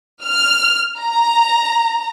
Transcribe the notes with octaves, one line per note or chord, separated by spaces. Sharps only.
F6
A#5